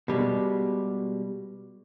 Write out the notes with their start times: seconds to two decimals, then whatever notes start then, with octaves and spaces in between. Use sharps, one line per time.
0.08 B2 G3 G#3